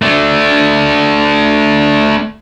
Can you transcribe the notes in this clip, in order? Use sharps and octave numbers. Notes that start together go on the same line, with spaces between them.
A3 D4